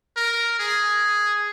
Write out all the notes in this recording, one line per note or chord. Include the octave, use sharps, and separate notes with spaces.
A#4
G#4